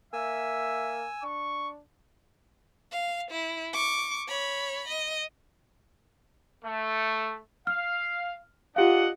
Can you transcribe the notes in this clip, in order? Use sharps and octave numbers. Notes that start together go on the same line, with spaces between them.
A#3 E5 G#5 E6
D4 C#6
F5
E4
C#6 D6
C#5 B5
D#5
A3
F5 F6
D4 F4 G4 D#5 F5 F#5